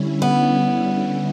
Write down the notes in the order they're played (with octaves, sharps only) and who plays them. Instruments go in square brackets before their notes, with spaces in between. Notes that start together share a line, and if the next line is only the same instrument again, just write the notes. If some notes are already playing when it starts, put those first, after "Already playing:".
Already playing: [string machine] D3 G3 C#4 E4
[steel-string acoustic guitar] B3